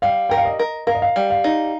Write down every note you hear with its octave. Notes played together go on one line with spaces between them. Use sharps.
G3 F5
A#4 G5
F5
D#5
A#4
A#4 F5
D#5
F5
G3
F5
D#4